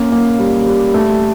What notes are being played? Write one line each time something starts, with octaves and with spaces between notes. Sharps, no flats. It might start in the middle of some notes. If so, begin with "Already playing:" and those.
Already playing: A#3 C#4
A#3
G3
G3
A3